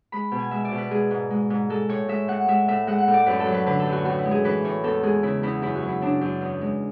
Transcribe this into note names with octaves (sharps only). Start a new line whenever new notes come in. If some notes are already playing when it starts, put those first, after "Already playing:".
G#3 B5
B2
G#5
G#3 E5
D5
B2
B4
G#3 G#4
G#2
G#3
G#2
G#3 A4
A2 C#5
G#3 E5
A2 F#5
G#3 E5
A2 E5
G#3 F#5
F#5
A2
D5
F#2 B4
A4
F#3
B4
D3 B4
A4
F#2
F#4
A2 F#4
E4
G#3
G#4
E3 B4
A2 C#5
E2 A4
G#3 G#4
C#3 E4
E2 E4
F#2 E4
F#4
F#3
E4
C#3 D4
F#2
E2
G#3